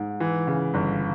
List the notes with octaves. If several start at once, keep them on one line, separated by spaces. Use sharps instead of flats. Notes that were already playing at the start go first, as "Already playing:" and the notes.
Already playing: G#2
E3
C#3
G1